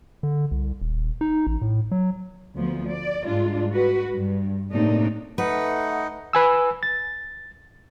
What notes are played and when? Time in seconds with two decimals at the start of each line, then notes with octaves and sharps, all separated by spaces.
0.23 D3
0.51 C2
0.81 D#1
1.21 D#4
1.47 A1
1.61 A2
1.91 F#3
2.56 D2 F3 B3
2.91 D5
3.25 G#2 G3 D4 F4
3.72 F#4 B4
4.14 G2
4.71 A2 C3 A#3 D4 D#4
5.38 A3 D#4 B4 F#5
6.33 B4 G#5 E6
6.83 A6